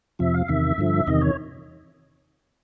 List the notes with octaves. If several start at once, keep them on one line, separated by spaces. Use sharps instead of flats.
F2 C3 F3 E5
F5
E2 C3 D#3 E5
G2 D3 F3
E2 C3 D#3 D#5
C#5